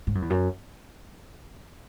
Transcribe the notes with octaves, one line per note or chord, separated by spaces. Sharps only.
G#2
F#2
E2
F#2